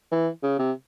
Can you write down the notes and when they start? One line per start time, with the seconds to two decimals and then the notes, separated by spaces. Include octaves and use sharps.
0.12 E3
0.43 C#3
0.59 C3